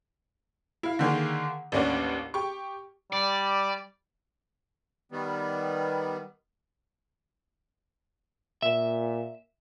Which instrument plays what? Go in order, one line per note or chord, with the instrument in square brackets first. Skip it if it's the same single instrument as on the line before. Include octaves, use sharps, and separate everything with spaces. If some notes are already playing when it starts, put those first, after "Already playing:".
[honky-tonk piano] E4 F5
D3 D#3 A#3 G#4
A1 D#2 A#3 C#4 D4 F#5
G4 C#6
[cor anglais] G3 [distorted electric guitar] D5
[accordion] D#3 G3 B3
[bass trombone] A#2 [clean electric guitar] E5